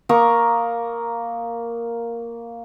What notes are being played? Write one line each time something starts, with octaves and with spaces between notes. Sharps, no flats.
A#3 A#5 C#6 D#6